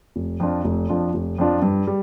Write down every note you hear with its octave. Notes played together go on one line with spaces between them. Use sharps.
F1
F2 F3 D4 F4
F1
F2 F3 D4 F4
F1
F2 F3 D4 F4
G2
G3